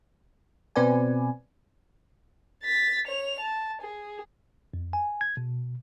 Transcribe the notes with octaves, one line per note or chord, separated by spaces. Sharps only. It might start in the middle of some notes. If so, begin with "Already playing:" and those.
B2 C4 B4 D5 G#5
A6 B6
C#5 F7
A5
G#4
F2
G#5
G#6
B2